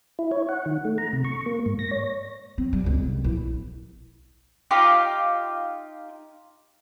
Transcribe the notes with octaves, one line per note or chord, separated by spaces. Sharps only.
E4
C#5
F#5
D#3
A3
A#5
C3
C#6
A#3
G#2
A#6
C#5
C4
G3
C#2 D3
C2
A#1 E4
D#4 F4 G4